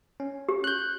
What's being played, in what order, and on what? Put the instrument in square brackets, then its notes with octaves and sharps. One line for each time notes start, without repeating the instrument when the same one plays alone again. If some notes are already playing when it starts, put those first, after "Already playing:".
[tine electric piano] C#4
[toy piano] G4
[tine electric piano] F#6 G6